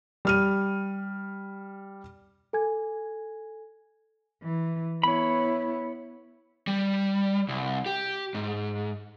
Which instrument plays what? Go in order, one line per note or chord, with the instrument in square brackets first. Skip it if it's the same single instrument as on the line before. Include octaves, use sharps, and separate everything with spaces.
[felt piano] G3 F6 D#7
[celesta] A4 G#5 G#6
[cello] E3
[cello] B3 E4 [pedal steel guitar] C#5 B5
[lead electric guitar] G3
C2
G4
G#2